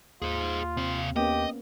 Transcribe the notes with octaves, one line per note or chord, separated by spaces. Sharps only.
D#2 F4 G#4 C5
C3 C4 F5
A#3 B3 C#4 G4 D#5